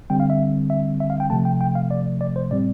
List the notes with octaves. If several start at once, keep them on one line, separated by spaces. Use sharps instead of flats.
D3 G3 C4 G5
F5
E5
E5
E5
F5
G5
C3 F3 A3 A5
G5
G5
F5
D5
D5
C5
A2 G3 C4 D5